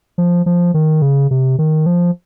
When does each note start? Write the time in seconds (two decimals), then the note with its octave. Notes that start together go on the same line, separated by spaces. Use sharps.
0.18 F3
0.46 F3
0.74 D#3
1.02 C#3
1.31 C3
1.59 D#3
1.86 F3